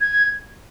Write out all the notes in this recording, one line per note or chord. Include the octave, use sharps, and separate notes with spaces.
G#6